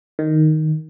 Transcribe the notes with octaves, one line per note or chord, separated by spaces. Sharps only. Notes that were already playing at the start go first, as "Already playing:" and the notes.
D#3